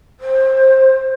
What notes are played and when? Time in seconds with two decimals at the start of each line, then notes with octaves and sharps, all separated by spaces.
0.20 C5